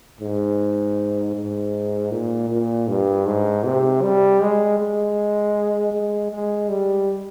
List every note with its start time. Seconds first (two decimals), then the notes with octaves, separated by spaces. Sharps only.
0.21 G#2
1.35 G#2
2.11 A#2
2.49 A#2
2.88 G2
3.26 G#2
3.64 C3
4.02 G3
4.40 G#3
4.78 G#3
5.92 G#3
6.31 G#3
6.69 G3